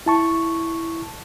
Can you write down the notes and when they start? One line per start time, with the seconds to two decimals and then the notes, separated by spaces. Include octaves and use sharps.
0.06 E4 A5 C#6